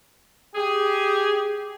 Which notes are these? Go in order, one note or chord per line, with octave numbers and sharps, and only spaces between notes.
G4 G#4